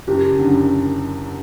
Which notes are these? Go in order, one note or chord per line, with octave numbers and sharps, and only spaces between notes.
F#1 G4
F#2 D3